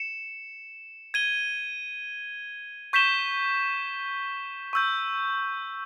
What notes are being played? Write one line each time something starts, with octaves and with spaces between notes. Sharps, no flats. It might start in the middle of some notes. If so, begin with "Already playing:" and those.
Already playing: C#7 E7
G#6 D#7 G7
C#6 G6 B6 E7 G7
C#6 E6 G6